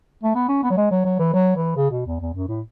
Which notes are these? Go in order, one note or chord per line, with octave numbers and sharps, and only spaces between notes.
A3
B3
C#4
B3
F#3
G#3
F#3
F#3
E3
F#3
E3
C#3
B2
E2
E2
F#2
A2